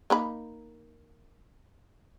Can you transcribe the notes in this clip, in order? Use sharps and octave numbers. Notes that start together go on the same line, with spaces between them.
A#3 D#4 B5